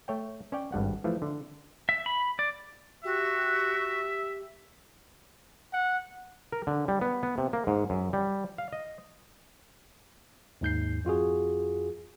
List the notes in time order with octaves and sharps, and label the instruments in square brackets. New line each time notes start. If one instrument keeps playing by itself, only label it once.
[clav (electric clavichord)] A3 C#5 G5
C#4 C#5 D5 G5
G#1 G2 G3 F#5
E3 F3 A3
D3
[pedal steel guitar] E5
B5
D5
[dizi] F#4 [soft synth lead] G4 [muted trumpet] E5
[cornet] F#5
[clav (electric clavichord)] A#4
D3
G3
B3
B3
C3
A#3
G#2
F#2
G3
F5
D#5
[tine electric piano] D#2 G#2 G6 C7
F2 F4 F#4 G#4